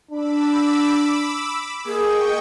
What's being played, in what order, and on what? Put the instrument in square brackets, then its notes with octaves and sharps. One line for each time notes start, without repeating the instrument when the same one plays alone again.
[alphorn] D4 [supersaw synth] B5 D6 E6
[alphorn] A#3 [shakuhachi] G#4 [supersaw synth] D#5 G5 C#6